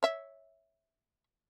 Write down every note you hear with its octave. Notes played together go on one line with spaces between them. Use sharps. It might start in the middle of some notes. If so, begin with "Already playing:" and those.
C#5 E5